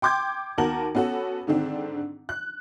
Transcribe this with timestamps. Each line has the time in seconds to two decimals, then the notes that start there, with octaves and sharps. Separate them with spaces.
0.02 G5 C6 D6 G6 G#6
0.58 D#2 B3 F#4 A#4 A5 F#7
0.95 B3 C#4 F#4 A4
1.47 G#2 D3 D#3 C4 D4
2.29 F#6